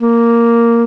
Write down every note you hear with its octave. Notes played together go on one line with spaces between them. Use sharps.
A#3